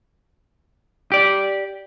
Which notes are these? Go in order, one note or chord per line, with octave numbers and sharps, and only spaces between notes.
G4 D5